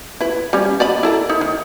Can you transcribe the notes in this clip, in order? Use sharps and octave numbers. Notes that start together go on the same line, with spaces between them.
E4 B4
G3 C#4
D5 D#5 B5
E4 A4 A#4
D#4 E4
D#3